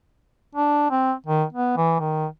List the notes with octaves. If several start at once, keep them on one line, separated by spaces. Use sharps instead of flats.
D4
C4
D#3
B3
E3
D#3